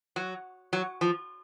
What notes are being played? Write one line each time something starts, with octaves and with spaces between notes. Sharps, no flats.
F#3
F#3
F3